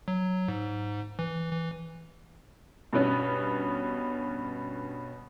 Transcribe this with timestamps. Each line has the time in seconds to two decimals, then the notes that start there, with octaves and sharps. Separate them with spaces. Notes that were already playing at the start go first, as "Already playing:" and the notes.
0.08 F#3
0.48 G#2
1.19 E3
1.51 E3
2.93 G2 B2 B3 C#4